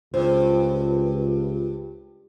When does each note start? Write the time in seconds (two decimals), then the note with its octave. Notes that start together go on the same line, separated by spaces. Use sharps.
0.14 C#2 G2 F4 C5